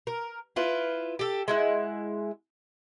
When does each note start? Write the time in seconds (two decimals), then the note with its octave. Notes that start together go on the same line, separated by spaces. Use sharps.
0.07 A#4
0.56 E4 F4 B4
1.19 G4 A4
1.48 G#3 E4 F#5